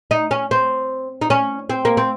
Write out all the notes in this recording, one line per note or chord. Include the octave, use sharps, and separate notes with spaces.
D#4
C#4
C4
D#4
C#4
C4
A#3
C4